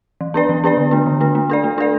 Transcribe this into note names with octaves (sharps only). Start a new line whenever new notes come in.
E3
B3 D4 B4 D5
E3
B3 D4 B4 D5
D3
A3 D4
D3
A3 D4
A3
D4 A4 D5
A3
D4 A4 D5